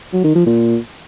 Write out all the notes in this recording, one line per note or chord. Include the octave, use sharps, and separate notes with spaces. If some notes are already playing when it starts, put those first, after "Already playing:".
F#3
D#3
F3
A#2